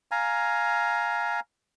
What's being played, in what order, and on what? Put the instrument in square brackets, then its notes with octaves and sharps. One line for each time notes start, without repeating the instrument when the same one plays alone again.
[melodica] F5 G#5 A#5